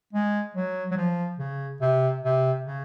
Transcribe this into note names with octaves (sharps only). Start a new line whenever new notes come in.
G#3
F#3
F#3
F3
C#3
C3
C3
C#3